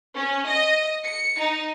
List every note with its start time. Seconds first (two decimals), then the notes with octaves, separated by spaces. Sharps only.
0.16 C#4
0.48 D#5
1.06 C#7
1.40 D#4